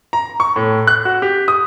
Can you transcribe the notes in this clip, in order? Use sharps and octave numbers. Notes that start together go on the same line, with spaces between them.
A#5
C#6
A2
F#6
F#4
G4
D#6